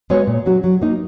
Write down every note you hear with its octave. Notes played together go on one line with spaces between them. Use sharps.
G#3 B3 F#4 C#5
A#2
F#3 C#4 F#4
F#3
A#3 D#4